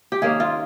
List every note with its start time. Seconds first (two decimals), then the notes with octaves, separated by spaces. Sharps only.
0.12 G4
0.22 D#3 A#3 C#4 G#4
0.40 F4